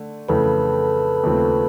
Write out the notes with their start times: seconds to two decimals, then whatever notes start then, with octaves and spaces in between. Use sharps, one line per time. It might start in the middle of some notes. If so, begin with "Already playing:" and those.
Already playing: D3 A3
0.29 F2 C#3 E3 A3 A4 B4
1.24 D#2 C#3 F3 A3 C4